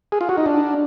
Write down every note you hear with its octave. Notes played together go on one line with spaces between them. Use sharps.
G#4
F4
F#4
D#4
D4